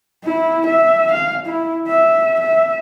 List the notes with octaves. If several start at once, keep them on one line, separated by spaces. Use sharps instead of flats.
E4
E5
F5
E4
E5
E5